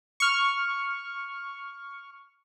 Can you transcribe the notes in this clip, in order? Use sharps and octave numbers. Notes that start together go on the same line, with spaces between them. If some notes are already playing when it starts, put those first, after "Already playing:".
C#6 F6